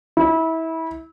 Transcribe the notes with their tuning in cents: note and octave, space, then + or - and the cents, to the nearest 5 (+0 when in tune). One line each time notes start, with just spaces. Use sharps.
E4 -25